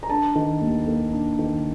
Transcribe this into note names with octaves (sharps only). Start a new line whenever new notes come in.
A#5
D4 A5
D#3
D#2
A#3
D4
D#3